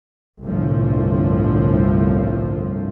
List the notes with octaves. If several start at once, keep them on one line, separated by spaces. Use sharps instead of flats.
G1 C2 A2 D3 F3